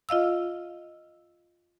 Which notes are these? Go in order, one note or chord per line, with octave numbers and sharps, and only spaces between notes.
F4 D#5 F5 E6